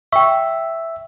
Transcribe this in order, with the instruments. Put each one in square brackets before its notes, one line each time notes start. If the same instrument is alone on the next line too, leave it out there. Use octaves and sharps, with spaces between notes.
[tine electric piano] E5 [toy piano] G5 C#6